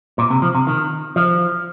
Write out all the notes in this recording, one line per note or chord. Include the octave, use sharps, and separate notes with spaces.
A#2
C3
F3
C3
D#3
F3